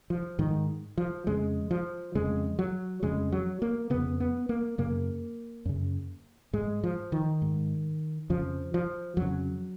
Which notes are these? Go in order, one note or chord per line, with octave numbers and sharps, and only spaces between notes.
F3
G#2 D#3
F3
F2 C#3 G#3
F3
F2 C#3 G#3
F#3
F2 C#3 G#3
F#3
A#3
F2 C#3 B3
B3
A#3
F#2 C#3 A#3
F#2 C#3
G#2 G#3
F3
D#3
G#2
F2 C#3 F3
F3
F2 F#3
C#3